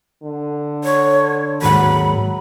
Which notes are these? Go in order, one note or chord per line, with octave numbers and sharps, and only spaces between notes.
D3
C#5
D#2 G#2 F#3 F#5 B5